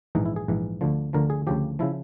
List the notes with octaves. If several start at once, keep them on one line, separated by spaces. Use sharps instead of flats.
A#1 G#2 E3 D#4
E4
G#4
A#1 G#2 E3
D2 D3 F3
D2 D3 F3 A#4
G#4
D2 C#3 F3 G4
C#3 F3 E4